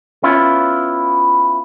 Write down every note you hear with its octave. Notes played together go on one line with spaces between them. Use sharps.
B3 C#4 E4 F4